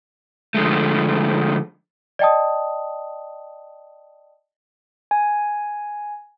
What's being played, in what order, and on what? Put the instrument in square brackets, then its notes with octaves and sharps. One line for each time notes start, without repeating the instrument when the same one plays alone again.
[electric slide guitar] D3 F3 G#3 A3
[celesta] D5 D#5 G5 A5 D#6
[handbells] G#5